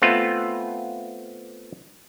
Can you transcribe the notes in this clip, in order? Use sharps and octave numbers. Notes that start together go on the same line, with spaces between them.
A3 B3 C4 F4